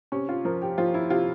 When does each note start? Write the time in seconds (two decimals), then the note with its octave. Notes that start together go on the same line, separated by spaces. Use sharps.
0.12 C3 C#4
0.29 F4
0.45 F3 A#4
0.62 G4
0.78 F3 F4
0.94 E4
1.10 C3 F4